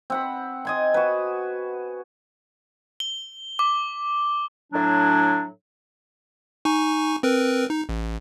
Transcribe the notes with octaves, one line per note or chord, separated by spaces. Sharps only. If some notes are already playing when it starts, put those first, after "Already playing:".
C4 F#5 B5
D#5 G#5 C6
F#4 B4
G7
D6
A2 F#3 D4
D#4 G#5 C#6
C4 A#4 B4
D#4
A1